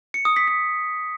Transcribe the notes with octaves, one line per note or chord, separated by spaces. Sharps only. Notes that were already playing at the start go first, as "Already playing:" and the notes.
C#7
D#6
B6
B6